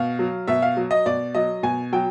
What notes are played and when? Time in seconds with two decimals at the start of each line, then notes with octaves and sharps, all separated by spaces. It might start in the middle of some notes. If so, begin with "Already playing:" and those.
Already playing: B2 F5
0.19 F#3
0.48 B2 E5
0.62 F5
0.77 F#3
0.91 D#5
1.06 B2 D5
1.35 F#3 D#5
1.63 B2 G#5
1.92 F#3 G5